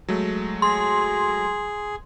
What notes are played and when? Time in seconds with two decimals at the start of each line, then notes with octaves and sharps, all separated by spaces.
0.08 F#3 G#3 A3
0.62 G#4 C6